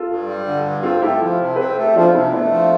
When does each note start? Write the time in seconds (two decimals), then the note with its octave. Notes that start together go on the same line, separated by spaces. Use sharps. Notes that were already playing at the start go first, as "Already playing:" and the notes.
Already playing: F4 A4
0.08 G2
0.27 G3
0.46 D3
0.65 G2
0.83 C4 F4 A4
1.02 A3 E4 G4
1.21 F3
1.40 C3
1.56 C4 B4
1.69 A4
1.77 A3
1.82 G4
1.95 F3 D4 F4
2.14 C3 C4 E4
2.33 A3 B3 D4
2.52 F3